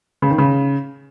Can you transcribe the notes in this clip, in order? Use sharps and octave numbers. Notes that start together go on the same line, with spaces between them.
C#3
D#3
C#3